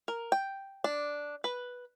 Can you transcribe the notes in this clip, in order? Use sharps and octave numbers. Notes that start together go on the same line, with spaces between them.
A#4
G5
D4
B4